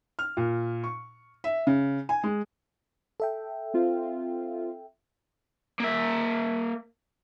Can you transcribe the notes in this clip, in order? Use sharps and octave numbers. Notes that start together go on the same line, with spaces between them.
F6
A#2
C#6
E5
C#3
G#5
G#3
A4 E5 G5
C4 F4
A#3 E5